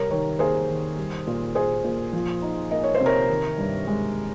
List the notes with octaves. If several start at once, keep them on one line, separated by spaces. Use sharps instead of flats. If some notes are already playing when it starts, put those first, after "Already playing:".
Already playing: C3 G3 A#4 C#5
D#3 A#4 C#5
A#3 G#4 C5
D#3
G3
A#2
A#3 G#4 C5
A#2
F3
D#4
A#3 D#5
C#5
C5
C3
A#4 C#5
D#3
G2
G#3